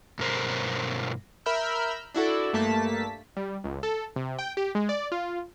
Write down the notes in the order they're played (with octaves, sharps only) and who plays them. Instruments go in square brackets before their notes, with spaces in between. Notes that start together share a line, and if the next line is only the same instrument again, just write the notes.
[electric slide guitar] G2 B2 A#4 C5
[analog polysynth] A#4 E5 B5 E6 F6 G6
D4 E4 F#4 A4
G2 A3 A#3 A5 B6
[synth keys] G3
C#2
A4
C3
G5
G4
G#3
D5
F4